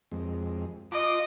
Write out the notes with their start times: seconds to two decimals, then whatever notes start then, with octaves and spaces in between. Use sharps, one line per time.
0.12 F2 G#3
0.92 F4 D#5 D6